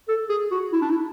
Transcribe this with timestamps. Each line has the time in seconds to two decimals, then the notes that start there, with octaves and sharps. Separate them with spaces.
0.08 A4
0.30 G#4
0.51 F#4
0.73 E4
0.82 D4
0.90 E4